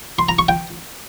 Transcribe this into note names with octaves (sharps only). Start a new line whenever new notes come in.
C6
A#5
C#6
G5